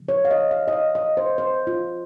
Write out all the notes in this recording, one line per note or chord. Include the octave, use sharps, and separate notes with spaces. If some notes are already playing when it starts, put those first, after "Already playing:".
Already playing: C#3 F3 G#3
C#5
F5
D#5
F5
D#5
F5
D#5
C5
C5
F4